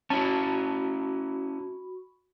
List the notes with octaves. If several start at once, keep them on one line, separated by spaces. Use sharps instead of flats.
C#4 E4 F#4 A5 B5 C#6